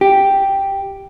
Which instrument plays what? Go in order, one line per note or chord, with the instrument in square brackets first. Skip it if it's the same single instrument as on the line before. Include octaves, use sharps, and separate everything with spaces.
[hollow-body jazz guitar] G4